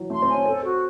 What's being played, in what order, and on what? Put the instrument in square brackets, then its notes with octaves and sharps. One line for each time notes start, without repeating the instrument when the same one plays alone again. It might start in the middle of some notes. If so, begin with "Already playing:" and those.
Already playing: [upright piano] E3 F#3
[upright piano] A3 [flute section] C6
[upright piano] C4
[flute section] G#5
[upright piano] C#4
[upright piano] C4 [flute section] A4
[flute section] F#4